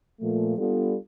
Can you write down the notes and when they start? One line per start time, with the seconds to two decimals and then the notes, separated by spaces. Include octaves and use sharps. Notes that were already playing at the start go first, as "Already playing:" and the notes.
0.20 A#2 F3 A3
0.58 G3 B3 D4 F4 A4